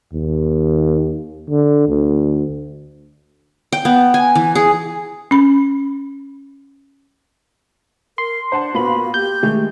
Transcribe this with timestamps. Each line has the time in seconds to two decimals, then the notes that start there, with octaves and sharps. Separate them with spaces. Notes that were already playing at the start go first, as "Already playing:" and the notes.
0.13 D#2
1.50 D3
1.88 D2
3.72 G5
3.85 B3
4.14 G#5
4.35 E3
4.55 G#4
5.31 C#4 B5
8.18 A#4 C6
8.52 D4 C5 F#5 A5
8.75 A#2 A#3 B3 F#4 B5
9.14 G4 G6
9.43 D#3 G#3 A3